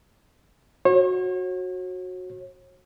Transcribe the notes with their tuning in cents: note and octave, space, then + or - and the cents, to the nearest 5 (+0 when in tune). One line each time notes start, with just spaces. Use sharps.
F#4 -10 C#5 -40